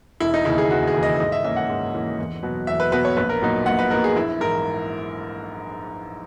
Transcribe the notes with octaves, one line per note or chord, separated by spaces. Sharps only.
E1 E4
D#4
D#2 C#3 E3 E4
G#4
E1 F#4
G#4
D#2 C#3 E3
D#5
G#2 D#5
E5
E3 A#3 C#4 E5
F#5
G#2
E3 A#3 C#4
E2
B2 F#3 B3
E2 E5
B4
B2 F#3 B3 B4
C#5
A#1 B4
A#4
A#2 F#3 B3 D#4
A#1 F#5
B4
A#2 F#3 B3 D#4 A#4
G#4
A#1 E4
G#2 E3 A#4